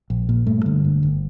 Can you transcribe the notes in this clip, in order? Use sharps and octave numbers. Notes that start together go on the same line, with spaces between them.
A#1
A#2
G2 A3
D3
G1
G1